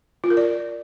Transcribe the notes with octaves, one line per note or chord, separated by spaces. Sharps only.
F4
A#4
D5